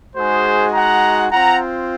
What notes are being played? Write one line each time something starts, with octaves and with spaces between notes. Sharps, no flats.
G#3 D#4 F#4 G#4 C5
F#5 A#5
C4 F4 F#5 A#5